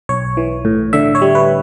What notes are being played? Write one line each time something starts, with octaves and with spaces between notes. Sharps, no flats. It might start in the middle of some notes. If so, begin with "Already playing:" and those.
B1 C#5
E3
A2
D3 E5
C#5
G3
B4